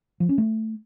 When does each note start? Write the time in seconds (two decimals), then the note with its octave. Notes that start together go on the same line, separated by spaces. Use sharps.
0.20 F3
0.29 C#4
0.38 A3